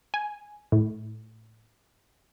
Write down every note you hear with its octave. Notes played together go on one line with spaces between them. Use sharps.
G#5
A2